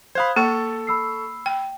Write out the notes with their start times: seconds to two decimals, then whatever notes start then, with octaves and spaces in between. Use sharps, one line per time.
0.15 C5 F5 B5 D#6 F#6 G#6
0.36 A#3 A4 C#6 A6
0.87 B5 E6 C7
1.46 G5